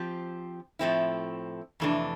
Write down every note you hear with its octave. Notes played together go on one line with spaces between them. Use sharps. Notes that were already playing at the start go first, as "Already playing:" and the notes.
Already playing: F3 C4 G4
A2 F3 A3 C4 E4
F2 C3 E3 A3 D4